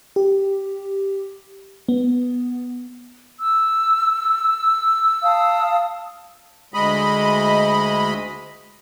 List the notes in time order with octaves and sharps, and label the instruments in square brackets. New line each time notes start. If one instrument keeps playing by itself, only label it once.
[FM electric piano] G4
B3
[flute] E6
[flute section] F5 A5 D#6
[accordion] D2 G#3 D#5 B5